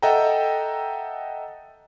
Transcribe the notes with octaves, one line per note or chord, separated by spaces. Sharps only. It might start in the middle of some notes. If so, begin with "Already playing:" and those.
A4 D#5 E5 F#5 G5 A#5